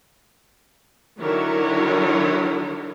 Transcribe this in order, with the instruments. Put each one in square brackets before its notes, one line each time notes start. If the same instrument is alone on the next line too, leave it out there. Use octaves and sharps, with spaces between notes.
[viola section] D3 D#3 F#3 E4 A#4 C#5